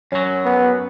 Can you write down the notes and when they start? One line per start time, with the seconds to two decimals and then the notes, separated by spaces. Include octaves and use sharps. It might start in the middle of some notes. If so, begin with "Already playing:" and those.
0.12 F#2 F#3 C#4
0.45 B3